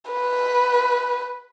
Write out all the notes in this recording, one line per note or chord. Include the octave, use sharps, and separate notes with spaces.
B4